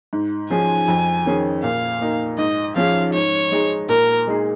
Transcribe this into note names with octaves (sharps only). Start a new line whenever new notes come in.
G#2
F3 C#4 G#4 G#5
F2
D#3 C#4 G#4
A#2 F5
A#3 D#4
G#2 D#5
F3 C#4 G#4 F5
G#2 C#5
G#3 D#4 G#4
A#2 A#4
G#3 D#4 G#4